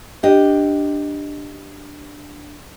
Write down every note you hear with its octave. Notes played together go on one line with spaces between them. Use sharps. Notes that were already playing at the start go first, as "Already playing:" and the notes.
D4 G4 D#5